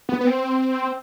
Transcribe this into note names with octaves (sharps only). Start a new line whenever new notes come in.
B3
B3
C4